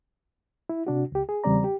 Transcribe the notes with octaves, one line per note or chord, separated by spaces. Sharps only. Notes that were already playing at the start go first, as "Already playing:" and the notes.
E4
C3 D4 F#4
C#2 G4
G#4
E2 C#3 G3 C4 D5 A#5
G4